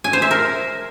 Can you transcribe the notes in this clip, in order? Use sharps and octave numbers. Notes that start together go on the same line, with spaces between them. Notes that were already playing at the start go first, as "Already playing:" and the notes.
G#5
C5
E5
A#4